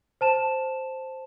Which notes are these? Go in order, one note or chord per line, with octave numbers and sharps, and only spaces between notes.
C5 A5 E7